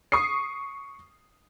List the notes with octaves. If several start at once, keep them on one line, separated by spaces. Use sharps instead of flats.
C#6 D#6 C7